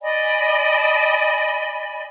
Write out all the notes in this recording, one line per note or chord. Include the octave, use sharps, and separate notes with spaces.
D5 D#5 G#5 B5